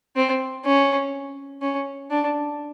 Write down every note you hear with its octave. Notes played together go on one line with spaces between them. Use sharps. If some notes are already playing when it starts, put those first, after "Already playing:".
C4
C#4
C#4
D4